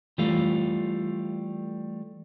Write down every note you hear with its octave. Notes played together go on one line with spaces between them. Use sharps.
E3 G3 A3 F4